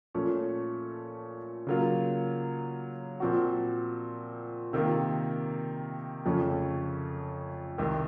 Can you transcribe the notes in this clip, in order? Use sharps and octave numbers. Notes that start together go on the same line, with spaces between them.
A#2 F3 A3 C#4
C#3 F#3 A#3 F4
A#2 F3 C4 F#4
C3 D#3 A#3 F4
F2 C#3 F3 A3 C#4
C2 C3 D#3